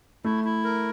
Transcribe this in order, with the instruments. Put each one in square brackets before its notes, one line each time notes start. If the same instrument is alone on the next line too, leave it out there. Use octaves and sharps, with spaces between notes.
[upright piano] A3 [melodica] E4
[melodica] E4
A#4